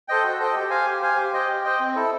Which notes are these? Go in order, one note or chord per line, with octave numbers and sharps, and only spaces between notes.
A4 C5 D#5 G5
F#4
A4 C5 D#5 G5
G4
C5 F5 G#5
G4
C5 F5 G#5
G4
C5 D#5 G5
G4
C5 D#5 G5
C4
E4 A4